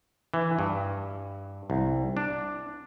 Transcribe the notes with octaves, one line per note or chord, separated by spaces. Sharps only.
E3
G2
C2
D4